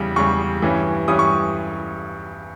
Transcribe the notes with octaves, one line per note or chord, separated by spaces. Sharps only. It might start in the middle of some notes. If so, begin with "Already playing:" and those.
Already playing: E2 C#3 G3
E2 C#3 G3 C#6
G2 E3 G3 C#4
G2 E3 G3 C#4 D#6
C#6